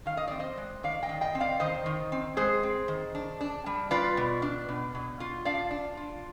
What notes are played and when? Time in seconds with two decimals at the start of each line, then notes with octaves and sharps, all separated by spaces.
0.06 D#3 F5
0.17 D#5
0.28 C4 D5
0.40 C5 D#5
0.57 G#3
0.83 D#3 D5 F5
1.03 D#5 G5
1.09 D#3
1.21 D#5 G5
1.35 C4
1.40 D5 F5
1.60 D#3 C5 D#5
1.86 D#3
2.12 C4
2.37 G#3 G#4 C5
2.63 C4
2.88 D#3
3.15 D4
3.41 D4
3.66 G3
3.91 F4 B4 D5
4.17 B2
4.42 D4
4.69 B2
4.95 B2
5.20 F4
5.45 D4 D5 F5
5.71 D4
5.97 F4